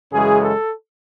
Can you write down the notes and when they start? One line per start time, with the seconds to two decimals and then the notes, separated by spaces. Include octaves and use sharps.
0.12 F#2 C#3 E3 G#3 G#4
0.41 A4